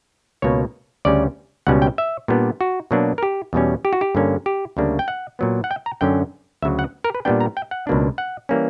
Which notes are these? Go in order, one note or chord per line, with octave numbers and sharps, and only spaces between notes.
C#2 B2 A#3 C#5
D2 C#3 G3 C#4 D5
C#2 B2 G3 C#4 F#5
G5
E5
A#2 G3 B3 D4
F#4
B2 F#3 A#3 D4
A#4
G4
E2 B2 G3 C#4
G4
F#4
G4
G2 D3 A#3 C#4
G4
D2 C#3 G3 A#3 D4
G5
F#5
A#2 F#3 B3
F#5
G5
A#5
F#2 D3 F#3 C#4 G5
D2 C#3 F#3 E5
F#5
A#4
B4
A#2 G3 B3 D4 G5
A#5
G5
F#5
C#2 B2 A#3 D4
F#5
E3 G3 A#3 C#4